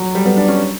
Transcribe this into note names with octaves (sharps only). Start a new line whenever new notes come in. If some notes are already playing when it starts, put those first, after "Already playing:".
Already playing: F#3
G3
B3
D4
C#4